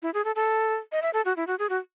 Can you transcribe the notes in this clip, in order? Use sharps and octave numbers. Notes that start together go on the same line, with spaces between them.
E4
G#4
A4
A4
D#5
E5
A4
F#4
E4
F#4
G#4
F#4